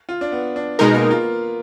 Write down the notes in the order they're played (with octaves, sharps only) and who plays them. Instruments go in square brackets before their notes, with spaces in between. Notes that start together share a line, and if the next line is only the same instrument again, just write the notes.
[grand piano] F4
D4
B3
D4
[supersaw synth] B2 G#3 D#4 A#4 [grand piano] B3
[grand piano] A#3
F4